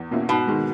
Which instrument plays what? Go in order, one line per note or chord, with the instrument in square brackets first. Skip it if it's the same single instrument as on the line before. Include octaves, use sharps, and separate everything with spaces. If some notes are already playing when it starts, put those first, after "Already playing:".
Already playing: [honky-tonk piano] E2
B2 A#3 C#4 E4
[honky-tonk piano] G#2 [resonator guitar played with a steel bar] B2
[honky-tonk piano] D#3 G#3